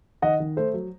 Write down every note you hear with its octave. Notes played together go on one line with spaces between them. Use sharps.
D#3 D#5 F#5
D#3
A3 C5
F#3